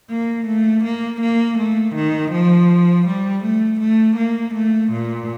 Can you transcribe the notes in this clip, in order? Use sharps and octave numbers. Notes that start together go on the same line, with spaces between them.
A#3
A3
A#3
A#3
A3
D#3
F3
G3
A3
A3
A#3
A3
A#2